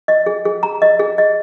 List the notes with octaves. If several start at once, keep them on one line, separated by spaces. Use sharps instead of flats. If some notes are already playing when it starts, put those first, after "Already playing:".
D#5
G#4
G#4
A#5
D#5
G#4
D#5